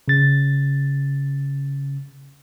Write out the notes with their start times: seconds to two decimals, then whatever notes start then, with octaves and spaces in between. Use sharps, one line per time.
0.08 C#3 A6